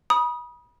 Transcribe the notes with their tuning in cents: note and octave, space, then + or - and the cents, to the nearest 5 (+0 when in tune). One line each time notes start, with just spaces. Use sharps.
B5 -35 D#6 +0